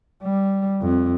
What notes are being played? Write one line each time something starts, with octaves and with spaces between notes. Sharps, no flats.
G3
F2